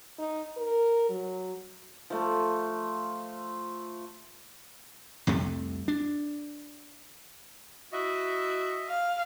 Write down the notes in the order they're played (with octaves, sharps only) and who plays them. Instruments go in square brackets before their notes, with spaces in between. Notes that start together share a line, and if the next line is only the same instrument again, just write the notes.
[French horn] D#4
A#4
F#3
[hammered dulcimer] F3 A3
[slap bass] C2 F2 C3 A3
D4
[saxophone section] E4 F#4 [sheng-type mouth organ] D#5 E5
[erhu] F5